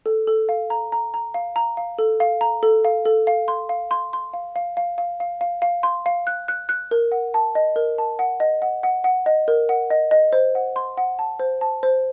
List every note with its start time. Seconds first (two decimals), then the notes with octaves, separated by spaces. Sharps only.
0.06 A4
0.27 A4
0.49 F5
0.70 A#5
0.92 A#5
1.14 A#5
1.34 F5
1.56 A#5
1.77 F5
1.99 A4
2.20 F5
2.41 A#5
2.63 A4
2.85 F5
3.05 A4
3.27 F5
3.48 C6
3.69 F5
3.91 C6
4.13 C6
4.34 F5
4.56 F5
4.77 F5
4.98 F5
5.20 F5
5.41 F5
5.62 F5
5.83 C6
6.06 F5
6.27 F#6
6.48 F#6
6.69 F#6
6.91 A#4
7.12 F#5
7.34 A5
7.55 D#5
7.76 A#4
7.98 A5
8.19 F#5
8.40 D#5
8.62 F#5
8.83 F#5
9.04 F#5
9.26 D#5
9.48 A#4
9.69 F#5
9.90 D#5
10.11 D#5
10.33 C5
10.55 F#5
10.76 C6
10.97 F#5
11.19 A5
11.40 C5
11.61 A5
11.83 C5